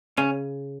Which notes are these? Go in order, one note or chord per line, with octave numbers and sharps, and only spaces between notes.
C#3 C#4